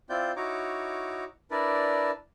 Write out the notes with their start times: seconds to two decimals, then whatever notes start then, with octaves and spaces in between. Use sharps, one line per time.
0.10 C4 E4 F4 D5 G6
0.36 D#4 E4 F#4 C#5 A#5 D6
1.51 D4 E4 A#4 B4 D5